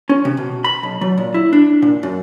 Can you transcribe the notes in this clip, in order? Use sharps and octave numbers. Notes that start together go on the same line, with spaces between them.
C#4
C3
B2
B5
B1
F#3
A#2
E4
D4
A#2
F#2